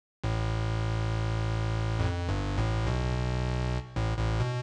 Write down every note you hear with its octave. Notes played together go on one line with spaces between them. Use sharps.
A1 A2
F2
G1 G2
A1 A2
B1 B2
A1 A2
A1 A2
B2